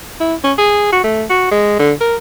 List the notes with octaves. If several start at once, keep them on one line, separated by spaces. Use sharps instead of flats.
E4
C#4
G#4
F#4
A3
F#4
G#3
D3
A#4